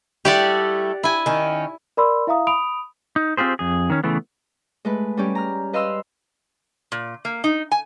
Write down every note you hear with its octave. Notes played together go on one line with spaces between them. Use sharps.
G3 A3 E4 G4 D5 F#5
E4 G#5
D#3 C#4
A#4 D5 B5 C6 E6
E4 E5 F5 A#5 D#6
B5 D#6 D7 F7
D#4
C4 F4 G4 G#4 C5
F2 G#4
D#3 C#4
C#3 E3 A3 B3
G#3 A3 B4
G3 C#4 G4
A#5 F6
B4 D#5 F5 C6 E6 F6
A#2
A#3
D#4
G#5